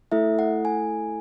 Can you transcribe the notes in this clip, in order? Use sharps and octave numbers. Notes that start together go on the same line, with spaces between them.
A3 E4 A4 E5
F#5
G#5